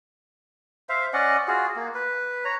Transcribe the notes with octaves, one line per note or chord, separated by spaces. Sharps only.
C5 E5 F5
C#4 D5 D#5 F#5
F4 F#4 G#4
A#3
B4
C#5 A#5